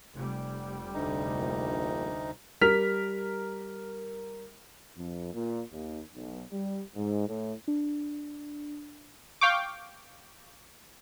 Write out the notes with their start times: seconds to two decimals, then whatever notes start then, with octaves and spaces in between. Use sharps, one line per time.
0.14 F1 G3
0.94 D2 D3 D#4
1.36 A#1
2.61 G3 A#4 F6 B6 F7
4.97 F2
5.33 A#2
5.72 D#2
6.15 B1
6.52 G3
6.95 G#2
7.27 A2
7.68 D4
9.41 F5 G5 C#6 D6